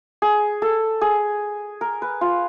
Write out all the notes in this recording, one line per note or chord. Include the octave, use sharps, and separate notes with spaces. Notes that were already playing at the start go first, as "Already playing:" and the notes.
G#4
A4
G#4
A#4
B4
F4